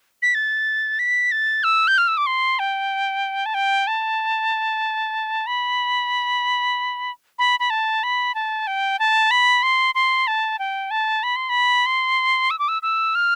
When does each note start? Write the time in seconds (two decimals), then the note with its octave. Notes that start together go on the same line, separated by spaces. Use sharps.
0.22 B6
0.35 A6
0.99 B6
1.32 A6
1.64 E6
1.88 G6
1.98 F6
2.08 E6
2.17 D6
2.26 C6
2.59 G5
3.46 A5
3.54 G5
3.87 A5
5.47 B5
7.39 B5
7.60 B5
7.70 A5
8.03 B5
8.35 A5
8.67 G5
8.99 A5
9.31 B5
9.63 C6
9.95 C6
10.27 A5
10.59 G5
10.91 A5
11.23 B5
11.36 C6
11.49 B5
11.86 C6
12.51 E6
12.59 D6
12.68 E6
12.82 E6
13.15 F6